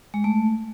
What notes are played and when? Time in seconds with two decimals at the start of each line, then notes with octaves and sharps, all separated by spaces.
0.14 G#3
0.24 A3